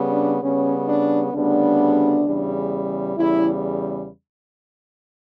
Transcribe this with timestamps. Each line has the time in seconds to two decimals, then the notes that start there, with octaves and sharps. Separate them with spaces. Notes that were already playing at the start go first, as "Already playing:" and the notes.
Already playing: C#3 G3 B3
0.10 D4
0.41 C#3 G3 B3 C#4
0.87 D4
1.32 D2 C#3 G3 B3 D4
2.24 E2 C#3 G3
3.16 E2 C#3 G3 E4